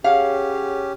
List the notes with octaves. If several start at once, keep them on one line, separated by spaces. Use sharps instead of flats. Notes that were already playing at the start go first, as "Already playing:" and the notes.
C#4 G4 G#4 C#5 F5 F#5